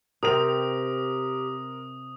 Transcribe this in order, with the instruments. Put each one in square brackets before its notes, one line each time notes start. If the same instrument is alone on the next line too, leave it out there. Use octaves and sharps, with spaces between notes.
[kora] C3 C4 [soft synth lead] G4 [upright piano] A#4 F7 [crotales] D#6